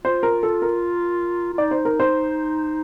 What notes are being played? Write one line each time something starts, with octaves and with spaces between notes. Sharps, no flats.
F4 C5
A#4
A4
A#4
F4
D#4 D5
C5
A#4
C5